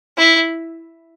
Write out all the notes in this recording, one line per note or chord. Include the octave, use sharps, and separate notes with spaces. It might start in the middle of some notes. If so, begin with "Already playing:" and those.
E4